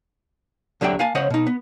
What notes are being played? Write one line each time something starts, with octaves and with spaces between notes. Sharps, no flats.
C2 D3 F#3 D4 E5 G5
A#3 F5 G#5 A5
C#3 C5 C#5 D#5 F#5
B2 D#4
B3